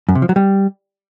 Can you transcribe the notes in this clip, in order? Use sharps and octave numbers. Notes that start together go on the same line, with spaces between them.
F#2
C3
F3
F#3
G3